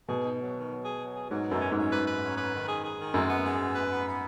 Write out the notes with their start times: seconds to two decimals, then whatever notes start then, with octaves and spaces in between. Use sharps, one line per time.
0.09 B2 G#4
0.24 D#4
0.39 F#3
0.54 D#3
0.70 F#3
0.85 G#4
1.01 F#3
1.15 G#4
1.31 G#2 F#3
1.46 B2
1.51 F#2
1.61 C#4
1.71 G#2 C#4
1.92 G#2 B4
2.07 B4
2.22 C#4
2.37 B4
2.53 D#3
2.68 G#4
2.84 G#4
2.98 D#3
3.14 F#2 G#3
3.29 B3
3.44 G#3
3.59 B3
3.75 B4
3.90 B3
4.06 B3